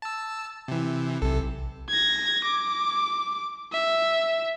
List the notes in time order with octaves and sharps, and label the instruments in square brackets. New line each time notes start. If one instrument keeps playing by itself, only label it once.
[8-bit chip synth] A5 E6
C3 E3
[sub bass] B1 [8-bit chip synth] C3 A4
[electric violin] G#6 A#6
D6
E5